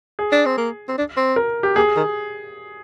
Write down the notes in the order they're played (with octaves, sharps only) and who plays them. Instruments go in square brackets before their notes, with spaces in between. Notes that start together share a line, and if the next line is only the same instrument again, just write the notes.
[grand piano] G#4
[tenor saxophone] D4
C4
A#3
C4
D4
C4
[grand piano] A#4
G4
[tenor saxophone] A#3 [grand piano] G#4
[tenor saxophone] D#3